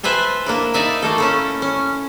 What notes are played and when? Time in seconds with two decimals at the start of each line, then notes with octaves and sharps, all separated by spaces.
0.03 B4 C5 E5 G#5 A5
0.46 A#3 D4 E4
0.74 D#4 D5 E5 G#5
1.02 A3 A#3 A4
1.18 C#4 E4 A4
1.62 C#4